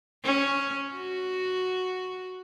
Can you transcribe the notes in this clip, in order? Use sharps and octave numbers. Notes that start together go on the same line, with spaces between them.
C#4
F#4